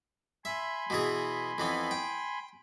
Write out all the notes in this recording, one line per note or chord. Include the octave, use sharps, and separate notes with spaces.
E5 G#5 B5 C6
B2 E3 G#4
F2 E3 B3
G5